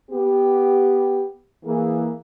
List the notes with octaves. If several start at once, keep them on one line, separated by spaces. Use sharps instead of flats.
B3 G4
E3 A#3 G#4